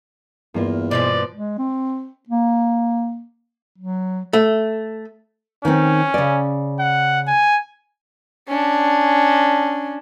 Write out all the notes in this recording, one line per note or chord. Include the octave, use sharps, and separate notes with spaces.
E2 G2 A#3 F4
B2 E3 F3 C5 D5
G#3
C4
A#3
F#3
A3
D#3 C4 C#4
C#3 D5
F#5
G#5
C#4 D4